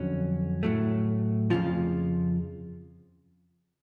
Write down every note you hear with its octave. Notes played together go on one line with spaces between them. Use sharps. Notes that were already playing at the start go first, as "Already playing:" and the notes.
Already playing: F2 D3 F#3 C#4
A2 F#3 A3
F2 C#3 F3 F4